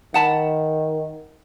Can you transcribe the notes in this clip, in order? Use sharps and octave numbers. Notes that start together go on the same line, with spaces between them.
D#3 F#5 A5 B5